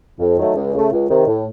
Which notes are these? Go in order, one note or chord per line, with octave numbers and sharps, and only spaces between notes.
F2
D#3 F#3 A3
C#2
C#3 A3
C#2
C3 D#3
A2